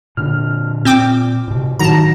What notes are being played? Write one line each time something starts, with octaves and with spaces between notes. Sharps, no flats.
A#2 D3 D4 F6
A#2 C4 G5 D6
A2 C3
A2 D#3 F#3 F#4 A5 A#5 A#6